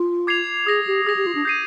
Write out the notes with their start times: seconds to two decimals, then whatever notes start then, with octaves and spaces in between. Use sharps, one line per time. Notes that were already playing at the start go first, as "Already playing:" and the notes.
Already playing: F4
0.27 D6 G#6 C7 F7
0.66 G#4 D#6 A#6 F7
0.87 G4
1.06 G#4 D#6 A#6 F7
1.17 G4
1.26 F4
1.35 D4
1.45 G6 C7 D#7